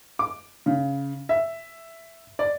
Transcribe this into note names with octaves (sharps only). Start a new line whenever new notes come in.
D6
C#3
E5
D5